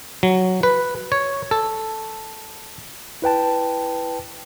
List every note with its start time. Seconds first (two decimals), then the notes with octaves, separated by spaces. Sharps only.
0.23 F#3
0.63 B4
1.12 C#5
1.51 A4
3.22 E4 B4 G5 A5